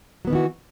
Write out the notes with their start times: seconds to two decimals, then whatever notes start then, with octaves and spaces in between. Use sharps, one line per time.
0.25 F#3
0.27 B3
0.30 D#3
0.33 E3
0.35 F#4